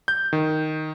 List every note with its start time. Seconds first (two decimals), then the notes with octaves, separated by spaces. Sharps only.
0.08 G6
0.33 D#3